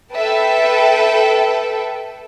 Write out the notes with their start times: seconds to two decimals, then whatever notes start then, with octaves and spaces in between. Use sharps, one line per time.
0.14 A4 B4 E5 G5 A5